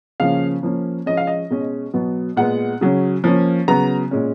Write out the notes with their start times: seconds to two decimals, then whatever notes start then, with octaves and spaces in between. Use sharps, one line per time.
0.20 C#3 F3 A#3 C#4 F5
0.63 F3 A#3 C#4
1.06 F3 G#3 C#4 D#5
1.17 F5
1.27 D#5
1.50 B2 G#3 C#4
1.94 B2 F#3 B3
2.36 A#2 G#3 B3 F#5
2.81 C#3 F#3 C#4
3.24 F3 A#3 C#4
3.68 C#3 F#3 B3 A#5
4.11 A#2 G#3 C#4